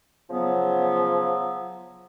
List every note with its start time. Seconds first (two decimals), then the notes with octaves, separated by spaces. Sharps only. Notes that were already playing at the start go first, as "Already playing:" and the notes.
0.30 C#3 F3 F#3 B3